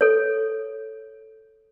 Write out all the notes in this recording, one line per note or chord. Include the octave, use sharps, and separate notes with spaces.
A4 C#5